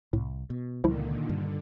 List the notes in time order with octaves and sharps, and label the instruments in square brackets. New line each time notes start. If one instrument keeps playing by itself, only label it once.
[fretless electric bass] C2 [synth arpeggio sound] A2
[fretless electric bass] B2
[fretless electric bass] C#2 [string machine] A#2 D3 D#3 [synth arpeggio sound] F3 G3 E4
[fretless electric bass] G2 [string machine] D3